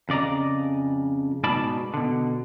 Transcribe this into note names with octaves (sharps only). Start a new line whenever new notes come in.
F2 C#3 D5 D#5 A#5
G#2 B2 D#4 D5 A5 B5
B2 D3